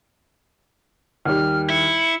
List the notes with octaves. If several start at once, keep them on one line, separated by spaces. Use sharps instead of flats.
D#2 G3 F6
E4 C#7